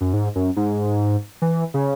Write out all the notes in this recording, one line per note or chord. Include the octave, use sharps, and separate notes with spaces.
F#2
G#2
F#2
G#2
E3
C#3